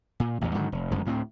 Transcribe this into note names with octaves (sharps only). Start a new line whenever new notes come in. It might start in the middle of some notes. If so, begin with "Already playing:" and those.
A#2
A1 E2
G#2 D3 D#3 F#3
F1
F1 F#2 D3 G#3
D2 A2 G#3 C4